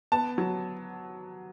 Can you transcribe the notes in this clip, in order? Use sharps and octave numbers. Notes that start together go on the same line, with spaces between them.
B3 A5
F#3